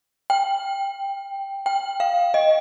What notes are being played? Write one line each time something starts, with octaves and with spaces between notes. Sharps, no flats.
G5
G5
F5
D#5